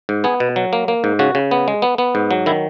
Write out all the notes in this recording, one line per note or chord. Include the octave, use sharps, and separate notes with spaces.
G#2
B3 G#4
B2
F#3
A#3
A#3
G#2
C#3 F#4
C#3
B3
G#3
B3
B3
G#2
F#3
D#3 E4